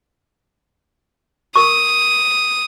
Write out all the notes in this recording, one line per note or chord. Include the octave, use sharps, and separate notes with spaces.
A#4 C#6 D#6